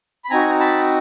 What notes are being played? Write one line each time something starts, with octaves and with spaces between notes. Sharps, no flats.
B5
C4 D#4 F#4 G#5 A#5
A5 B5